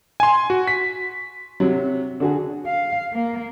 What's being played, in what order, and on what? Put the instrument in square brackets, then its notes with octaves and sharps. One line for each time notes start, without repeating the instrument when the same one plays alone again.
[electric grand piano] G#5 C6
F#4
B6
[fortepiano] C3 F#3
D3 F#4 G#4
[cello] F5
A#3